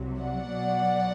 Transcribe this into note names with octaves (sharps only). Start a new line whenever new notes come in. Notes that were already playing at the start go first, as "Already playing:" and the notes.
Already playing: C2 C3 F#3
D5 F#5
B1 B2 F#3